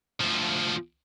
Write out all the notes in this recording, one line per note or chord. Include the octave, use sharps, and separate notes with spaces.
D2 F3